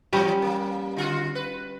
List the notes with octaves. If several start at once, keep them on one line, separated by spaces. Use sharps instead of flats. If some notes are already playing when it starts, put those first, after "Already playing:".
E3 F#3 G3 C#4
A#3
D3 F4 F#4
B4